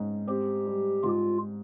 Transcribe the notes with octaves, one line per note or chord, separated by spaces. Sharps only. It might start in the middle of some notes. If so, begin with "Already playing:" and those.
Already playing: G#2 C#4
C4 G4
G3
G#2 F4